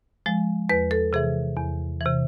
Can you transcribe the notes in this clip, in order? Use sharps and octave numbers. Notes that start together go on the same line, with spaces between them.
F3 G#3
E2 B4
A4
C3 E3 G#4
E2
C3 E3